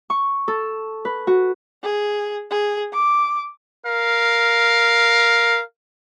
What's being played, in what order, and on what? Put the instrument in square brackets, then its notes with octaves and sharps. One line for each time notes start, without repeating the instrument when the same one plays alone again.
[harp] C#6
A4
B4
F#4
[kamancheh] G#4
G#4
D6
[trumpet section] A#4 F5